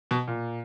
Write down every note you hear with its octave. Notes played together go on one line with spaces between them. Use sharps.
B2
A#2